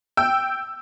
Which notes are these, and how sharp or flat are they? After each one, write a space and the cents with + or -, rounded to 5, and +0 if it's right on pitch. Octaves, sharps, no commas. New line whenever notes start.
G5 -5 E6 +0